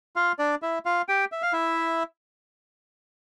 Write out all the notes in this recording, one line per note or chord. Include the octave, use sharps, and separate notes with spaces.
F4 F5
D4 D5
E4 E5
F4 F5
G4 G5
E5
F5
E4 E5